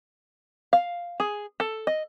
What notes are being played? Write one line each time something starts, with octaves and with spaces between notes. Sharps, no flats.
F5
G#4
A4
D#5